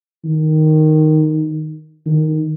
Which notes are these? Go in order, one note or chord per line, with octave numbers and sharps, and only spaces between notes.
D#3
D#3